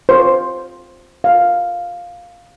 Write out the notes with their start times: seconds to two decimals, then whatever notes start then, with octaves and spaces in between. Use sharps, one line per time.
0.09 C5
1.24 F5